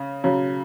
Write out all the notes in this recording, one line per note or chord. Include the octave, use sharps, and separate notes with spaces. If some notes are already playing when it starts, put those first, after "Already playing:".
Already playing: C#3
C#3 F#3